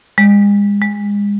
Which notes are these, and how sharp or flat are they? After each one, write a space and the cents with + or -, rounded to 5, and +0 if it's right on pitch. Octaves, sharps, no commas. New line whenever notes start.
G#3 -35
G#3 -25